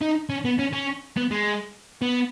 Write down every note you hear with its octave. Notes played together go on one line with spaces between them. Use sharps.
D#4
C#4
B3
C#4
C#4
B3
G#3
B3